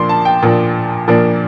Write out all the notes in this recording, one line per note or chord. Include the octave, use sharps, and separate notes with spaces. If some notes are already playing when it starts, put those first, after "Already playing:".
Already playing: A#2 F3 A#3 D4 C6
A5
G5
A#2 F3 A#3 D4
A#2 F3 A#3 D4